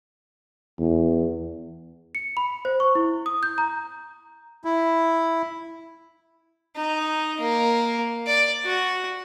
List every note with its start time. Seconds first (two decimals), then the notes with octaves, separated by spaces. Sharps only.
0.79 E2
2.15 C#7
2.37 B5
2.65 C5
2.80 C#6
2.95 E4
3.26 D#6
3.43 G6
3.58 A#5
4.65 E4
6.76 D#4
7.41 A#3
8.27 D5
8.65 F#4